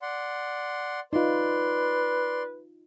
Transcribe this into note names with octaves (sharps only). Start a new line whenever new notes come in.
D5 F#5 C6
D#4 F4 B4 D5 C6